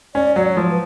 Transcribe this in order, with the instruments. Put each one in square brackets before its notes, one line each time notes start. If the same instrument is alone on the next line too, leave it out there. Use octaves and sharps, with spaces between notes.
[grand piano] C#4 [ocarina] D5
[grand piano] F#3 [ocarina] D5
[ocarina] C#5
[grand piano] F3
[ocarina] B4